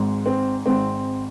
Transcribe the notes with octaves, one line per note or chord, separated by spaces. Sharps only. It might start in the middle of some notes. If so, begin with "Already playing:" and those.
Already playing: G#1 G#2 G#3
C4
G#1 G#2 G#3 C4